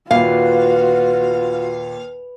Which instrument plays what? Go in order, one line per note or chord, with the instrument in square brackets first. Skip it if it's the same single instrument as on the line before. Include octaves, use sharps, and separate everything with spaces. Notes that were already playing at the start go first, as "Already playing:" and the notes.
[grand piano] D#2 A#2 [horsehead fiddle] F4 F#4 [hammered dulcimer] B4 [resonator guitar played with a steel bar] F5